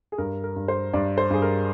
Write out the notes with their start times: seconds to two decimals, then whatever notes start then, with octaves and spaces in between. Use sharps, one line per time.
0.12 G#4
0.18 G2 A#4
0.44 A#4
0.56 G2
0.68 C5
0.93 G2 D5
1.18 C5
1.30 G2 G#4
1.42 A#4